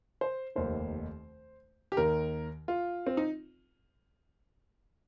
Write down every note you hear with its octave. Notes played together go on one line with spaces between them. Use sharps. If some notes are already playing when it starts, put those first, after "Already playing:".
C5
F1 D#2 D#3 C5
G4
D#2 D#3 A#4
F4
C4
D#4